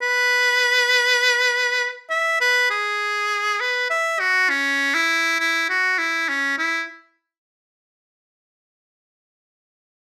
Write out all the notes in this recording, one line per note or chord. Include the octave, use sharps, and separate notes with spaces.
B4
E5
B4
G#4
B4
E5
F#4
C#4
E4
E4
F#4
E4
C#4
E4